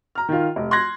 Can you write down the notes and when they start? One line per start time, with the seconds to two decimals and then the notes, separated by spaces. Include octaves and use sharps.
0.15 A#5 F6
0.29 D#3 F4
0.56 F1
0.71 C6 F#6 G#6 A#6